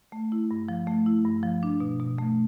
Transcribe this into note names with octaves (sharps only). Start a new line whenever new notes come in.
A3
E4
G2
F3
A3
E4
G2
F3
D4
B2
B2
A3